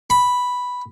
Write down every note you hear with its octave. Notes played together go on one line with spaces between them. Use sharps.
B5